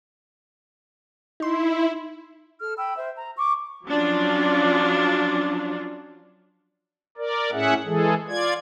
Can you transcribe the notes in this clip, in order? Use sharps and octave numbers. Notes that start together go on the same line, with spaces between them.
D#4 E4 C6
A4 F6
G5 B5 E6
C5 E5
A#5
C#6 D6
F3 F#3 C#4 D4 F4
A#4 D5
A2 C#4 G#4 E5 F#5
E3 G#3 G#4 A4
F4 D5 G#6